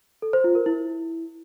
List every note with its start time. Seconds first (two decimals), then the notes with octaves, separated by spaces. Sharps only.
0.22 A4
0.33 C5
0.44 F4
0.55 A#4
0.66 E4